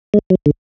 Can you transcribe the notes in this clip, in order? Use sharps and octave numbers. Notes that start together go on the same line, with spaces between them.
G#3
F#3
D3